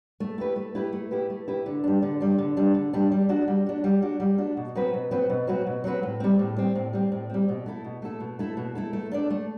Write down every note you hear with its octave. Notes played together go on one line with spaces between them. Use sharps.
A3
E4 G4 B4
A3
E4 G4 B4
A3
E4 G4 B4
A3
E4 G4 B4
D3
G3 D4
D3
G3 D4
D3
G3 D4
D3
G3 D4
G3
D4 F#4
G3
D4 F#4
G3
D4 F#4
G3
D4 F#4
B2
F#3 C4 F#4 B4
B2
F#3 C4 F#4 B4
B2
F#3 C4 F#4 B4
B2
F#3 C4 F#4 B4
A2
G3 C4
A2
G3 C4
A2
G3 C4
A2
G3 C4
B2
A3 E4 A4
B2
A3 E4 A4
B2
A3 E4 A4
B2
A3 E4 A4
A3
D4 A4 D5
A3